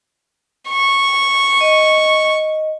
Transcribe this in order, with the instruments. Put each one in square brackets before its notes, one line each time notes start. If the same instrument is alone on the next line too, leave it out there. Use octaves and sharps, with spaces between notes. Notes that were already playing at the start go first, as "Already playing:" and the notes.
[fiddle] C#6
[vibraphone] D#5